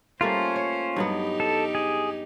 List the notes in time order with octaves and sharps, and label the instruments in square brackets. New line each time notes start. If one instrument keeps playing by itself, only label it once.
[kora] G3 A3 A#3 [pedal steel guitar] C#4 F4 [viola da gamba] C5
[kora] C#5
[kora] G2 F#3 B3 [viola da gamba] D#4 G4
[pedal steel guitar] A4
G#4